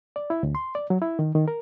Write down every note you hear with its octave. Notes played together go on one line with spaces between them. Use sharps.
D5
E4
D2
C6
D5
F#3
E4
D#3
D#3
A#4